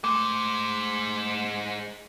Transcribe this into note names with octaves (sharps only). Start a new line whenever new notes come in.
G#3 A3 C5 D6